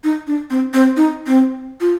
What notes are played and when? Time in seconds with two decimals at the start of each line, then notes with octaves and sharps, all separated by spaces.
0.04 D#4
0.27 D4
0.50 C4
0.74 C4
0.97 D#4
1.27 C4
1.81 F4